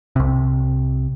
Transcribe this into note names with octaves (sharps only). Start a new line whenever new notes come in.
C2 C3